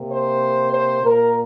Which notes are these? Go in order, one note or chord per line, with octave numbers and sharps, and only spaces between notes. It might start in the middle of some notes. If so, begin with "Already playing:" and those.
Already playing: C3 A#3
C5
C5
A#2 A#3 A#4